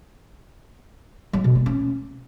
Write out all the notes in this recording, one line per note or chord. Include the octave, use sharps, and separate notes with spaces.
F#3
B2
A3
C#4